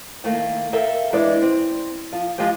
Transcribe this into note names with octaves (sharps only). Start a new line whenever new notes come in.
D#3 A3 A#3
A4 A#4 E5 F5 G5
E3 G#3 D4 B4 D5
C4
F3
F3 G#3 F4 G4 G5